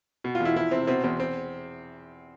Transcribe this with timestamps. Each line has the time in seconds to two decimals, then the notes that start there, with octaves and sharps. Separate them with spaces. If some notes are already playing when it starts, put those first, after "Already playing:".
0.24 B2
0.35 F4
0.40 E2
0.45 E4
0.56 F3 E4
0.71 C3 C4
0.87 B2 C4
1.04 E2 C4
1.20 C4